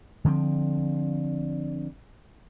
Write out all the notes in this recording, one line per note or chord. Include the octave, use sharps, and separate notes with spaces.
D3 F3 A#3 C4